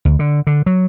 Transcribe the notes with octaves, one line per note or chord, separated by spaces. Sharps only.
D2
D3
D3
F#3